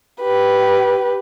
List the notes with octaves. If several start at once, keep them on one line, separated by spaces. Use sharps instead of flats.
G4 B4